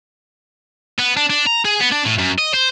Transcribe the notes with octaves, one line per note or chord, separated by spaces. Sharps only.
B3
D4
D4
A#5
G#4
B3
D4
A2
F#2
D#5
C5